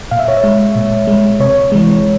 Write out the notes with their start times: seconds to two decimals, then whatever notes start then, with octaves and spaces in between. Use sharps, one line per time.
0.11 A#2 F5
0.19 E5
0.28 C#5
0.37 E5
0.44 G#3
0.76 A#2
1.07 G#3
1.40 C3 C#5
1.72 E3 G#3